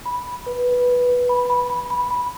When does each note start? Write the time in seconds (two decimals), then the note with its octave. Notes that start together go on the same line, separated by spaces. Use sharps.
0.05 B5
0.26 B5
0.46 B4
0.68 B4
0.88 B4
1.09 B4
1.29 B5
1.50 B5
1.70 B5
1.90 B5
2.10 B5